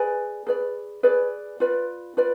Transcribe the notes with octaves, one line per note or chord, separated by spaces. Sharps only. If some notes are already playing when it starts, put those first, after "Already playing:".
Already playing: G#4 B4 D5 G#5
G#4 B4 D5
G#4 B4 D5
F4 B4 D5
F4 B4 D5